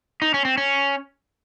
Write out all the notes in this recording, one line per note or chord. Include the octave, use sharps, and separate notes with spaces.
D#4
C#4
C4
C#4